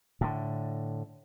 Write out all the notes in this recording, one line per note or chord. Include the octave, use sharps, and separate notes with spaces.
A2 D3